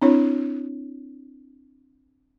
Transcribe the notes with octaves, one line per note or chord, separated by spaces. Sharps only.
C4 D4 E4 C#5